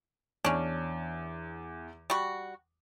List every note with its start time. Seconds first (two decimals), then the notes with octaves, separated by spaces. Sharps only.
0.44 E2 C#4 D4
2.10 G3 F#4